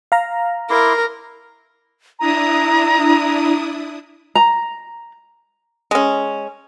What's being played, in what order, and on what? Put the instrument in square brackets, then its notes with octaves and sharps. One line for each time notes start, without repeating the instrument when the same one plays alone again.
[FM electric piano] F5 A#5
[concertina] E4 C6 D6 [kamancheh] A#4
[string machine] D4 E4 D#6 [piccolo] A#5
[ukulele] A#5
[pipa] G#3 C#4